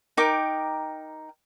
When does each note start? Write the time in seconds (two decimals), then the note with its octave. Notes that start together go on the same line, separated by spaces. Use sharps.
0.17 D#4 A#4 G5 D6